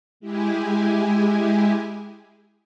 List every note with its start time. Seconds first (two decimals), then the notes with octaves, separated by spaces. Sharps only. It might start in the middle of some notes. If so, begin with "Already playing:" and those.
0.20 G#3 E4 G4 G#4